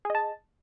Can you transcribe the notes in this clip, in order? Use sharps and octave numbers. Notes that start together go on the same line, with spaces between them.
G#4 D#5 A5